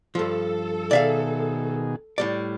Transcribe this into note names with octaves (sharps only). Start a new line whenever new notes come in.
G2 F3 A4
B2 D#3 G#4 D5 E5 F5
A2 G3 D5